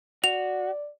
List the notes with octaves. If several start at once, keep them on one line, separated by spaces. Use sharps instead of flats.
F#4 D5 F7